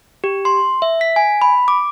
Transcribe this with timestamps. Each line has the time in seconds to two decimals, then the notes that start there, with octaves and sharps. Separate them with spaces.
0.24 G4
0.45 C6
0.82 E5
1.01 B6
1.16 G#5
1.42 B5
1.68 D6